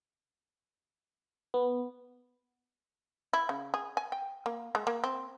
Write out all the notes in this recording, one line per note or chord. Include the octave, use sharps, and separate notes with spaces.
B3
E4
C#3
G#4
G#5
G5
A#3
G#3
A#3
C4